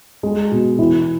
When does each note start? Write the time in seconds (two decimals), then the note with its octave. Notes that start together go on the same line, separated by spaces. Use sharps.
0.23 G#3
0.51 B2
0.79 E3